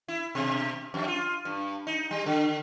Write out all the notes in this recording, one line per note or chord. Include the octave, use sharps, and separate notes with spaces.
E4
B2
F2
F4
G2
D#4
G3
D3